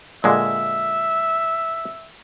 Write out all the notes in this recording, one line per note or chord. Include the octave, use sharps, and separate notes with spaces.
A#2 D3 G#3 E5